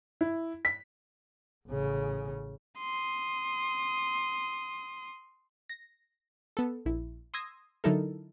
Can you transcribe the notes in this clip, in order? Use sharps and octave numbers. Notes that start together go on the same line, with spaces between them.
E4
B6
A1 C#3
C6 D#6
A#6
B3 A4
A#1 E4
C6 D#6 E6 G#6 A#6
D3 F#3 D#4 E4 A4 A#4